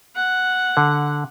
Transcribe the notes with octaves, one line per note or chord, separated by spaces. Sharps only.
F#5
D3